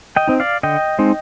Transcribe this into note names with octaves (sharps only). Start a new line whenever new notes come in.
D#5 G5
C4 D#4
D5 F5
D3 D#5 G5
G#3 C4 D#4